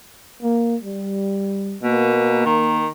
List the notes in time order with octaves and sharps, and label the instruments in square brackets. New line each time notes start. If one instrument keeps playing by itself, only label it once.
[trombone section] A#3
G3
[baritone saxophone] B2 [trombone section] A#3
[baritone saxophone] D#3